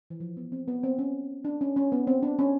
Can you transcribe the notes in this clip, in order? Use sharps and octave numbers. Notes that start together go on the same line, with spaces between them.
E3
F3
B3
C4
B3
C4
C#4
D4
C#4
C#4
B3
C4
D4
C#4